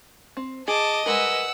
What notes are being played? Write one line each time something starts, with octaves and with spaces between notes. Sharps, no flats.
C4
G#4 D#5 A5 D6
G3 G#3 A#4 B4 F#5 G#5 E6